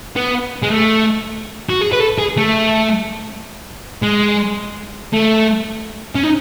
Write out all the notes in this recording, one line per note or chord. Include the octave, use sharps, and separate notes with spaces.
B3
G#3
A3
F#4
G#4
B4
A4
G#4
A3
G#3
A3
C#4
D#4